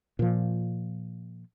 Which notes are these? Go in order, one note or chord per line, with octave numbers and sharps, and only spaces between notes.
A#2 F3